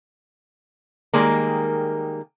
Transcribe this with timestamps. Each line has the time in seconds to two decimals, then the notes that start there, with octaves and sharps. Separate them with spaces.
1.13 D#3 G3 G#3 A#3